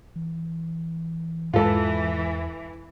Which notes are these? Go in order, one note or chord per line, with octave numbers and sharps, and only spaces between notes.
E3
E2 G#2 E3 G#3 F4 A4